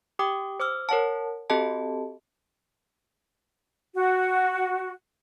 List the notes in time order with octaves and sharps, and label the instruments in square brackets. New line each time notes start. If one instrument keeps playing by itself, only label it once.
[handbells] G4 G5 D6 D#6
C5 D6 E6 F6
A#4 C#5 F#5 A5
C4 F#4 G4 A4 D#5 A5
[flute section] F#4